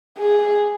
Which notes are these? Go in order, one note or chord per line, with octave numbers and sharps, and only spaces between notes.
G#4